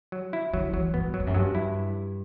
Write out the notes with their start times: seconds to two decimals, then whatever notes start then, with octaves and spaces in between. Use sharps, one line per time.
0.12 F#3
0.33 E4
0.53 D3 F#3
0.73 E3 F#3
0.94 G2 B3
1.14 F#3
1.20 E2
1.27 F#2
1.34 G2 F#3
1.55 E4